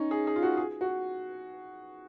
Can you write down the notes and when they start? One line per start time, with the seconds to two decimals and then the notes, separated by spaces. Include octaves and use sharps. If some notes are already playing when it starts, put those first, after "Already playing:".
Already playing: C#4 D#4
0.11 G#4
0.27 G#4
0.36 F4
0.43 F#4
0.57 G#4
0.81 F#4